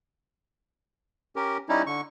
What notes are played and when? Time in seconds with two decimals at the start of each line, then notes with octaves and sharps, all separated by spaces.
1.36 C#4 G4 A#4
1.69 G3 C#4 D#4 E4
1.87 D3 C#6